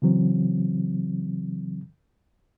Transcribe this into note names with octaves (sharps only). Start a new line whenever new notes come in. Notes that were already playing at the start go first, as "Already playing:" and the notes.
C#3 E3 F#3 C4